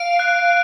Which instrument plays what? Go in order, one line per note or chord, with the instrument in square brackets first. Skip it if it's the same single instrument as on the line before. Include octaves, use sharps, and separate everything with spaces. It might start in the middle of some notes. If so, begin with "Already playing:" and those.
Already playing: [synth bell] F5 [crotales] D7
[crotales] F#6